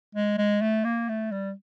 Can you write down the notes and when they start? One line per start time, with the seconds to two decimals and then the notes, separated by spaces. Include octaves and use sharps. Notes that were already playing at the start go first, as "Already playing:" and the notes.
0.15 G#3
0.37 G#3
0.62 A3
0.84 A#3
1.09 A3
1.31 G3